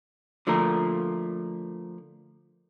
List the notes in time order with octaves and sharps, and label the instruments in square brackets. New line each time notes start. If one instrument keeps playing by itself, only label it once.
[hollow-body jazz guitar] D3 F3 A3 A#3 A#4